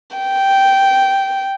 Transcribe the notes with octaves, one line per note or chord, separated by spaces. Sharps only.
G5